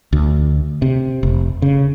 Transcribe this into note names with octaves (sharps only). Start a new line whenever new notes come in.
D2
C3
F1
C#3